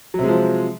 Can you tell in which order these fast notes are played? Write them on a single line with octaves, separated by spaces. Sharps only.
F#3 C3 G#3 F3